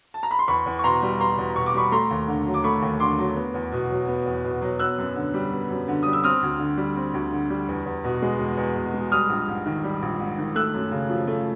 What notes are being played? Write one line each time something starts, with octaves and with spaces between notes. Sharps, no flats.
A5
A#5
B5
C6
E2 B5 C#6
E2
C#6
B2 A#5 C6
G3
E2 A#5 C6
E2
B2 C#6
D6
G3 B5 C#6
A3 A#5 C6
D#2
D3
F#3
D6
A3 B5 C#6
D#2
D3 C6 D6
F#3
B3
E2
B2
F#3
B3
E2
B2
F#3
B3 E6 F#6
F#2
D3
G3
B3
F#2
D3
G3 D#6
E6
C4 D#6 F6
D2
D3
G3
C4
D2
D3
G3
E2
E2
B2
G#3
E2
E2
B2
G#3
G3 D#6 F6
A#1
G#2
D#3
G3
A#1
G#2
D#3
A3 E6 F#6
F#2
C#3
F3
A3